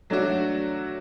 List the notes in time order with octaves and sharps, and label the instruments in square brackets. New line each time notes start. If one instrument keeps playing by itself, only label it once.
[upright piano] F#3 A3 D4 F#4